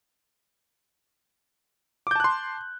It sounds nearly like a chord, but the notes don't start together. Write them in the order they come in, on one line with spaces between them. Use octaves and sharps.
D6 G6 A5 F#6 C6